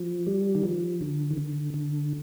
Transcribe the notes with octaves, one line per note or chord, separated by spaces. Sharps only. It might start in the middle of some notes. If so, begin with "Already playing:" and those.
Already playing: F3
G3
D#3
F3
D3
D#3
D3
D3